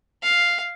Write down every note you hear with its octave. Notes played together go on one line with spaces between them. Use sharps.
F5